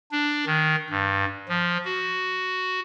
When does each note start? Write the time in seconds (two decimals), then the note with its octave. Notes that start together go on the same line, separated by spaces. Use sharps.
0.12 D4
0.46 D#3
0.90 G2
1.48 F3
1.85 F#4